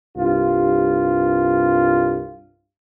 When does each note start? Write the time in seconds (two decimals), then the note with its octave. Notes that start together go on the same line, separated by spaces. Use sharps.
0.17 C2 G2 F4